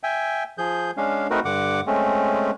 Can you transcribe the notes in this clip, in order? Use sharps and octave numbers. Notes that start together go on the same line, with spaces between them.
E5 G5 G#5
F3 G#4 G6
G#3 C#4 D4 F5
A3 C4 D#4 F#4 A#4 B4
G2 D3 F#5 D6
G#3 A3 C4 C#4